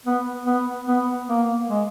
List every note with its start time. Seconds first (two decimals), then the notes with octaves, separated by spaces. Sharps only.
0.06 B3
0.46 B3
0.87 B3
1.29 A#3
1.69 G#3